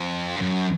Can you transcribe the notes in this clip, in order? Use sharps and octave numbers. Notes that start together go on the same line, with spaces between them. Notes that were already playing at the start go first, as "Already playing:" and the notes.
Already playing: F2
G2
F#2